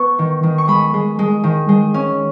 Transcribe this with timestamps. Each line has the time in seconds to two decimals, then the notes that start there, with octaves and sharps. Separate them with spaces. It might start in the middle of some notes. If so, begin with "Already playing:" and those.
Already playing: B3 C#6
0.19 D#3
0.43 D#3
0.58 C#6
0.68 G#3 B5
0.94 G#3
1.19 G#3
1.44 D#3
1.69 G#3
1.94 C#4